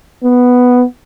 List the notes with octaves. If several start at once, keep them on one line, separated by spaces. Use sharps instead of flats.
B3